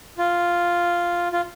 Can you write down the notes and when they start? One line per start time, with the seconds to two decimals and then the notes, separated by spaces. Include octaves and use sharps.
0.18 F4
1.32 F4